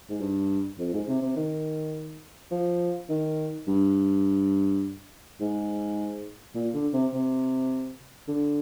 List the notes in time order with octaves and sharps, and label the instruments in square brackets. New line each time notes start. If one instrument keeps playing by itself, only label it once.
[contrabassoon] G#2
G2
F2
G#2
C3
C3
D#3
F3
D#3
G2
G#2
A#2
D3
C3
C3
D3